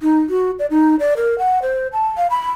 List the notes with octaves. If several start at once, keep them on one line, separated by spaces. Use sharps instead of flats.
D#4
F#4
D5
D#4
D5
A#4
F#5
C5
A5
F5
B5